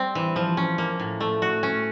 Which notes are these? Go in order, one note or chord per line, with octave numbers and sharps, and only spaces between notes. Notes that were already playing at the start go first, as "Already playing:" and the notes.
Already playing: G3 C4
E3
F3
C#4
A#3
A2
A3
F#4
C#4